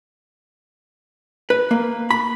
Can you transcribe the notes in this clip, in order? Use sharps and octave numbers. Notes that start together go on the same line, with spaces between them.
B4
A#3
B5